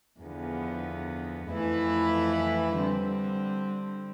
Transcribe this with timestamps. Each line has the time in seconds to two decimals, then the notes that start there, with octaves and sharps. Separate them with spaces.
0.21 E2 D3 F3 B3
1.50 F2 E3 A3 E4 B4
2.77 D3 G3 C4